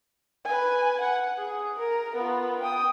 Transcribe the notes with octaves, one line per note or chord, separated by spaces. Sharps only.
B4 G#5
F#5
G#4
A#4
B3 F4
G5 D#6